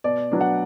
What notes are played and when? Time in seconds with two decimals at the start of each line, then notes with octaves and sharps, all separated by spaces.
0.04 B2 D5
0.32 F#3 B3 D4
0.41 F#5